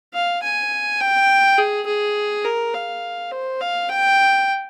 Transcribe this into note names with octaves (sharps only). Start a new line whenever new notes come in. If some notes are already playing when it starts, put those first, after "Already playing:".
F5
G#5
G5
G#4
G#4
A#4
F5
C5
F5
G5